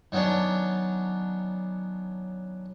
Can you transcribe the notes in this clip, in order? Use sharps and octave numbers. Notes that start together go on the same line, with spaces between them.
D#3 F#3 B3 C#4 D4